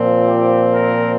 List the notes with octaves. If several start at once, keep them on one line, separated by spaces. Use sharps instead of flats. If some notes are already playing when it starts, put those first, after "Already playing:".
Already playing: A#2 F3 C4
G4
A#4